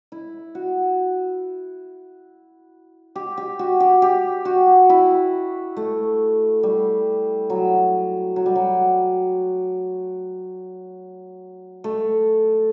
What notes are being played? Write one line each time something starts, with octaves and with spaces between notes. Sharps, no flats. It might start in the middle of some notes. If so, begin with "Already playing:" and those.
E4
F#4
G4
G4
F#4
G4
G4
F#4
E4
A3
G3
F#3
F#3
G3
F#3
A3